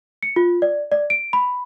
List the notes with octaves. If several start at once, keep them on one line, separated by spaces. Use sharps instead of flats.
C#7
F4
D5
D5
D7
B5